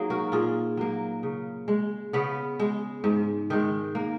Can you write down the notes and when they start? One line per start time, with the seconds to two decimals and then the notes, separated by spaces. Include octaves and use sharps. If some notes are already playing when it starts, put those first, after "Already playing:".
Already playing: F#3 A#3 D#4 G#4
0.10 F#4 A#4
0.32 A#2 F4 G#4
0.77 F#3 A#3
1.23 C#3
1.68 G#3
2.13 C#3 B3
2.59 G#3
3.04 G#2
3.50 D#3 G#3
3.95 A#3